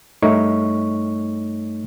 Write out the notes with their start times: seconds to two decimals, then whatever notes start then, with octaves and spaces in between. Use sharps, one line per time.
0.23 G2 A3 D#4 C#5 C#6